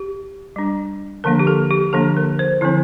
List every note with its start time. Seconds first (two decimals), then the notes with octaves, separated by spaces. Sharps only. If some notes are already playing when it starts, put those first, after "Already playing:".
Already playing: G4
0.56 G3 D4
1.24 D3 F3 A#3 D4 A#4
1.39 G4
1.47 A4
1.71 G4
1.93 D3 F3 A#3 D4 A4
2.17 A#4
2.39 C5
2.61 D3 F3 C4 E4